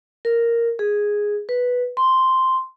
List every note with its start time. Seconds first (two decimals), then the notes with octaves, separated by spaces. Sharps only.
0.25 A#4
0.79 G#4
1.49 B4
1.97 C6